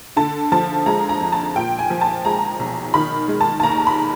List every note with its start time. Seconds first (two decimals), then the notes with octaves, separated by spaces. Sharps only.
0.17 D3 A5
0.52 F3 A5
0.86 G#3 A#5
1.09 A#5
1.21 F2
1.32 A5
1.55 A#2 G5
1.79 G#5
1.90 F3
2.01 A5
2.25 G#3 A#5
2.59 B1
2.94 D#3 B5
3.28 G#3
3.41 A5
3.60 A5
3.63 D#2 A#5
3.87 B5